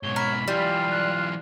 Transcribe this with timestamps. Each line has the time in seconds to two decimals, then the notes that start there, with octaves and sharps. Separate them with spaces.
0.03 G#2 B2 C#5 G7
0.16 A#4 B5
0.48 E3 F#3 G3 F4
0.91 F#6